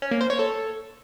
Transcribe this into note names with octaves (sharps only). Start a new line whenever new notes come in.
C#4
A#3
C5
C#5
A4